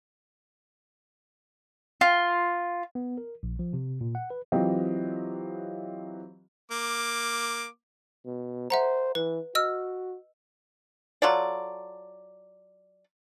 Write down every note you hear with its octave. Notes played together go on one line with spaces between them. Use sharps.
F4
B3
A#4
A#1
F3
C3
A#2
F#5
B4
E3 F#3 C4 F4 G4 D#5
A#3 D6
B2
C5 E5 F#5 A#5
E3 B4
F#4 D#5 E6 F6
F#3 F4 A4 D5